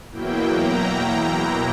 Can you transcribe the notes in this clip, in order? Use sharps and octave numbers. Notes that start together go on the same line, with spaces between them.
E2 B2 F#3 A#3 E4 G5
A#5